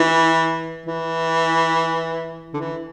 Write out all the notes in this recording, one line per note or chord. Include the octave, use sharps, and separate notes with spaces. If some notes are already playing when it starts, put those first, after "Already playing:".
Already playing: E3
E3
D3
E3